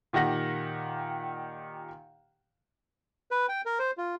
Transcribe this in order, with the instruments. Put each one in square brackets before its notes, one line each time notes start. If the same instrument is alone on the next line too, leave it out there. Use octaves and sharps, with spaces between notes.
[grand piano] A#2 D#3 G4 F#5 A#6
[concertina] B4
G5
A#4
C5
F4